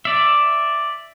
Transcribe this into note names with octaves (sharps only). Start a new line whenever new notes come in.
D5 E5